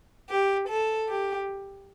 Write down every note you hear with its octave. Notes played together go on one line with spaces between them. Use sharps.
G4
A4
G4